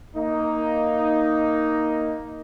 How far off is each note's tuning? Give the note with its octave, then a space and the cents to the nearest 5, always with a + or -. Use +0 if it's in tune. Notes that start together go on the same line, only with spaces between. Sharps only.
A#3 +0 D#4 +5